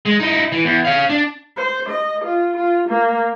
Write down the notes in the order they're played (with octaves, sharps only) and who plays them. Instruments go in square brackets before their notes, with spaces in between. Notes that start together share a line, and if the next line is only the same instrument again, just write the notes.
[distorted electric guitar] G#3
D#4 E4
E3
E2
C#5 F5
D4
[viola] C5
D#5
F4
F4
A#3